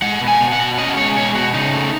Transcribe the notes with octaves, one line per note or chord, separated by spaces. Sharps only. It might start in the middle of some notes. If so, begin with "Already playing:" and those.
G#3 F#5
B2
G#5
B2
F#5
B2
C#4 D#5
G#3 C#5
B2 C#5
B2 F#4
C#3 D#4
A3